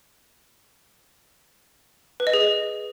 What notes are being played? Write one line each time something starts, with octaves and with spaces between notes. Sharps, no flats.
B4
D#5
G#4